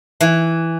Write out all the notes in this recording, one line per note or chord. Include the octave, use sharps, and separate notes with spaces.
E3